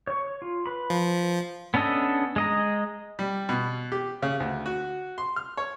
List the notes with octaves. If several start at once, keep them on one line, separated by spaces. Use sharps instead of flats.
C#5 C#6
F4
B4 B5
F3
B3 C#4 D4 A4 D#5
G#3 D#5 A#5
G3
B2
G4
C#3
D2
F#4
C6
F6
C#5